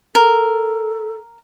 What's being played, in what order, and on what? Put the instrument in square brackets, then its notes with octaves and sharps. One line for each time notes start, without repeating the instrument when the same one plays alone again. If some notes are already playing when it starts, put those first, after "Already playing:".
[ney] A4 [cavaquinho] A#4